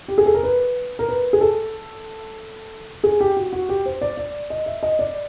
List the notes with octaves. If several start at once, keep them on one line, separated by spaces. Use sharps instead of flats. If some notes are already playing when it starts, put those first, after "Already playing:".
G4
G#4
A4
A#4
B4
A#4
B4
G#4
A4
G#4
G4
F#4
F#4
G4
C5
D5
D5
D#5
E5
D#5
D5